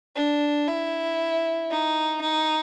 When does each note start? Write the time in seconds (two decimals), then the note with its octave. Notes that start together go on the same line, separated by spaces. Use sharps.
0.16 D4
0.68 E4
1.70 D#4
2.21 D#4